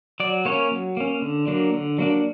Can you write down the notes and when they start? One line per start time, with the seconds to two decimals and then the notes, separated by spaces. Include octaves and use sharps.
0.20 F#3 D5
0.45 A#3 C#4 C#5
0.71 F#3
0.97 A#3 C#4
1.22 D3
1.47 F#3 A#3 D4
1.73 D3
1.99 F#3 A#3 D4